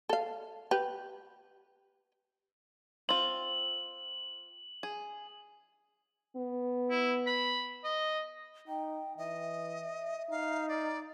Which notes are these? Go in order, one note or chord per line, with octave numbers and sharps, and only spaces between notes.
A4 F5
G4 B4
C4 F4 F#7
G#4
B3
E4
B5
D#5
D#4 G5
E3 D#5 E5
D#4 F5
D5